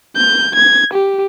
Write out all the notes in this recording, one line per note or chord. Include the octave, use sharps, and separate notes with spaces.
G6
G#6
G4